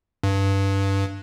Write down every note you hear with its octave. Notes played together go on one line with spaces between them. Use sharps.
G2